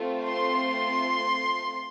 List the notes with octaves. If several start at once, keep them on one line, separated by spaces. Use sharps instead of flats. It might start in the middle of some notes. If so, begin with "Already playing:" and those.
Already playing: A3 C4 F4
C6